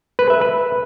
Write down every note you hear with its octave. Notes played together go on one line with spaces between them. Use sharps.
B4
E5
B4